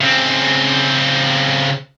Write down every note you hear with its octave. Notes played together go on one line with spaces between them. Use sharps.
C#3 C4